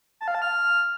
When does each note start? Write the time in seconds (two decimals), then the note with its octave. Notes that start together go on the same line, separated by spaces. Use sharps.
0.21 A5
0.28 F5
0.35 A5
0.42 F6